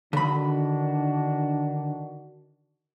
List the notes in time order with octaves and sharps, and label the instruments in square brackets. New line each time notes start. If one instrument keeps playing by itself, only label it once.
[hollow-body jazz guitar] D3 B5 [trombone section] D#3 D4 F#4